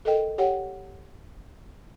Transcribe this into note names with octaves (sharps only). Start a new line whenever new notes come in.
A4 A#4 D#5 G5
G4 C#5 F#5 G5